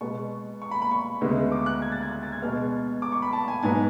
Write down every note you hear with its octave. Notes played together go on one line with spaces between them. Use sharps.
B2 G#3 B3 C#6
C#6
B5
B5
C#6
D2 C#3 G#3 B3
D6
F#6
G#6
A6
G#6
F#6
A6
G#6
B2 G#3 B3 F6
D6
C#6
B5
A5
G#5
G#2 F#3 B3 G#5